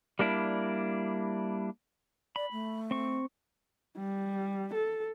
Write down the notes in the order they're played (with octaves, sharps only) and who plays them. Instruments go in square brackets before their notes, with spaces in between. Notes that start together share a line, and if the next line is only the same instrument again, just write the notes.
[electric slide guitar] G3 A#3 D4 E4
[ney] D5 [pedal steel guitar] B5
[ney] A3
[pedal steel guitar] C4 C#6
[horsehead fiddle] G3
A4